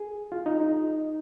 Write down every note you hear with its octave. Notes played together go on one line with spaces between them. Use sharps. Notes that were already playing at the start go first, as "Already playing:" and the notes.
Already playing: G#4
F4
D#4
D#4